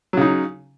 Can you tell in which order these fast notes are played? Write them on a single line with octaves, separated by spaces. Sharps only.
F#3 C#3 D#4